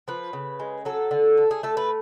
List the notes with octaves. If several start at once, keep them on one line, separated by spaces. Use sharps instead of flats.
F3 B4
C#3
G#3
F#3 A4
D3
A3
G#4
A3 A4
B4